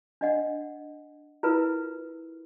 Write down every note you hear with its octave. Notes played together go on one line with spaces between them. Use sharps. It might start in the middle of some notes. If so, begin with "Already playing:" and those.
D4 D#5 F#5
E4 F4 A#4 B4